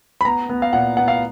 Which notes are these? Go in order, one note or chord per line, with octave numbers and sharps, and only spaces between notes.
B5
B3 A#5
B3
F5
A#2 F#5
B3 F#5
F5